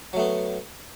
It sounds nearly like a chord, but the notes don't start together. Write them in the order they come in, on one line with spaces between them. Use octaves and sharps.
F#3 A3 B3